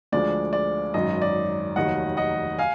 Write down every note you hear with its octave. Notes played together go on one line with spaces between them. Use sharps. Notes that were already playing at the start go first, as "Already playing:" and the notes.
D2 D3 F3 G#3 D5
D5
G#1 F#2 D#3 F#3 D#5
D5
F1 D#2 D#3 F#3 D#5 F#5
D#5 F#5
F5 G#5